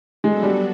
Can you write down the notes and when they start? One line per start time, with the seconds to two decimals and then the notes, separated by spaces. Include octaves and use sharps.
0.23 F#3 G#3 B3 D4 F#4 A4
0.43 G3